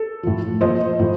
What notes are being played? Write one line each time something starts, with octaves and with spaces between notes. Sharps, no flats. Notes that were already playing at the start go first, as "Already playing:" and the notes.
Already playing: A4
A2 F3
A#2 F3 C5 D#5
A2 F3